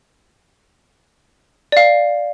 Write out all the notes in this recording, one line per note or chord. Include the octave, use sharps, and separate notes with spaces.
D5 F5